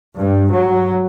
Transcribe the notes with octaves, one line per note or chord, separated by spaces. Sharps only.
G2
F#3